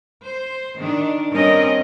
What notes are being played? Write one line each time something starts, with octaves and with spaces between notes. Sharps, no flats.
C5
D#3 D4
G2 C4 C#4 A#4 D#5